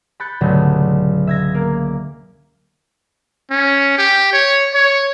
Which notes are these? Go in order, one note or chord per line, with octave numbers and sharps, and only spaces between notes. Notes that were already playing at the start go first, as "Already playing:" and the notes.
B5 F#6 G6 A6 C#7
C#2 G#2 B2 D3 F#3 A3
E5 G#6 A#6
A#3
C#4
G4
C#5
C#5